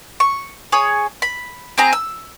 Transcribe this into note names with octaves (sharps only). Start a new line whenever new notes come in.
C#6
G#4 C#5 D#6
B5
C4 G#4 A#5
E6